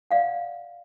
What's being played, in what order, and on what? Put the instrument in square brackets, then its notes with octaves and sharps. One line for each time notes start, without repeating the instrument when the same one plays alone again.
[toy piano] D5 F5 F#5